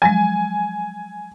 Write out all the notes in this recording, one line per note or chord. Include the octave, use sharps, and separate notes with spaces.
F3 F#3 G#3 G#5